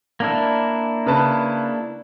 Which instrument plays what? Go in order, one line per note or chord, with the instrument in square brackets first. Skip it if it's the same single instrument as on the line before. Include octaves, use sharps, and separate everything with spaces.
[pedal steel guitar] A#3 D4 E4
[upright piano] C#3 B4 A5